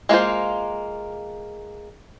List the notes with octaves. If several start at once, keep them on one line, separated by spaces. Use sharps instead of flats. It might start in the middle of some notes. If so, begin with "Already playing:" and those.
G#3 A#3 F4 C5